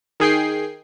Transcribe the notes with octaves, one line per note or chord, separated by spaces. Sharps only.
D#3 G#4 G5 C7